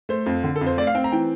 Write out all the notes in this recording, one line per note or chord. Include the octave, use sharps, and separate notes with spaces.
A3 C5
F2
D3
A4
F2
C5
A3 D5
F5
C4 G5
A#5
E3 G5